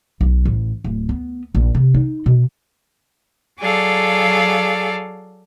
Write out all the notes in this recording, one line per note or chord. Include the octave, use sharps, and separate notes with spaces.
B1
A1
D1
B3
A#1
C3
D#4
B2
F#3 G#4 A4 D5 F5